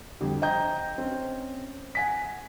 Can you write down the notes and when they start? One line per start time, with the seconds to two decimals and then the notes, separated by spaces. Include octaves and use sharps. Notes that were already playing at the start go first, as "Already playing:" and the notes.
0.21 F2 D3 G3
0.42 C5 D#5 G5 A#5 G6
0.98 C4 C#4
1.95 F#5 G#5 B6